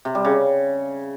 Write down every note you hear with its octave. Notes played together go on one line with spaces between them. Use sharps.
C3
G3
C#3